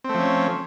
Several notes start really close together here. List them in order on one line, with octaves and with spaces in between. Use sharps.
C4 A3 F3 C#4